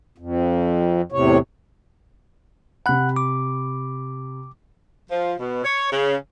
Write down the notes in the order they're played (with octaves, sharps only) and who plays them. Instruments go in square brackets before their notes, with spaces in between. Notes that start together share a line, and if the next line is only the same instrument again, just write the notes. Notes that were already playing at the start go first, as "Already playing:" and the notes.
[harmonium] F2
E2 A2 C3 C#5
[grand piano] C3 B5 [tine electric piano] F#5 F#6
[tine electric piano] D6
[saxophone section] F3
B2
C#5
C#3